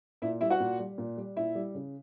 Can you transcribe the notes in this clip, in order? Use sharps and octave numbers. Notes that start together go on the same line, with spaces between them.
A#2 E4 E5
G3 E4 E5
F#4 F#5
A#2
G3
A#2
G3
A#2 E4 E5
G3
C#3